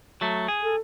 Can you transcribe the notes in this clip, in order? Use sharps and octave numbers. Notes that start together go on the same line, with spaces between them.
F#3 A3
G#4
A4